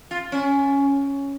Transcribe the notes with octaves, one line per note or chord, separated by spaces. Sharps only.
F4
C#4